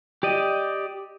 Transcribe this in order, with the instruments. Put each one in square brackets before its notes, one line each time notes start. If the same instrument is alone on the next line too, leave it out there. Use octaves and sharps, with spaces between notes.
[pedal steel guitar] G4 D5 D#5